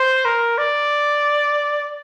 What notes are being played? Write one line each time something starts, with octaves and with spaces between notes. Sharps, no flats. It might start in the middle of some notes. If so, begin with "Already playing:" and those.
Already playing: C5
A#4
D5